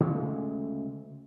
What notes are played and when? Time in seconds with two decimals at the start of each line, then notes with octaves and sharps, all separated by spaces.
0.01 D2 C#3 G#3 A3